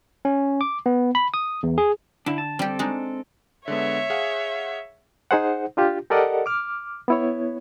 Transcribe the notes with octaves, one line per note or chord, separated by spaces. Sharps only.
C#4
D6
B3
B5
D#6
E2
G#4
D3 D4 E4
A5
G3 C4 G4 A4
G#3 D4 D#4
D3 G#3 B3 C#5 E5
G#4 F5 F#5
D#4 G#4 C5 F#5
D4 F4 G4
G4 A4 A#4 D5 D#5 F#5
D6 F6
B3 E4 C#5